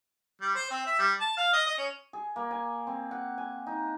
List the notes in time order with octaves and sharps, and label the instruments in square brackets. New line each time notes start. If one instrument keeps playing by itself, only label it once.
[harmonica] G3
C5
C4
E5
G3
A5
F5
D#5
D#5
C#4
[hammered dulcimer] G#4
A#3
G#5
C4
F#5
G#5
D#4